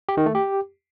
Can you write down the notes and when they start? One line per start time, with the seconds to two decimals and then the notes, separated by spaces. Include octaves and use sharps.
0.09 G4
0.17 D#3
0.26 A3
0.35 G4